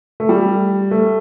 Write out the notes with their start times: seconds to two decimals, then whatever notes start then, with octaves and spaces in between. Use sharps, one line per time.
0.20 A3
0.29 G3
0.91 A3